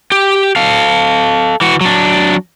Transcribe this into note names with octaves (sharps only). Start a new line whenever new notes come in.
G4
A4 F5
E3 F#4
F#3 D4